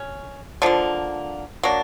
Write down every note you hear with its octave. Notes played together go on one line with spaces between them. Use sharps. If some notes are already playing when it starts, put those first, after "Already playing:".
Already playing: C#4
D3 F3 A#3
F#3 A#3 D4